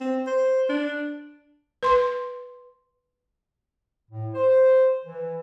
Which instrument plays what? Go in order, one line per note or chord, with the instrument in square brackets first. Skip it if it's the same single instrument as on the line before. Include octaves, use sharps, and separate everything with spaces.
[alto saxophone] C4
C5
D4
[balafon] B4 C6
[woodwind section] A2
C5
E3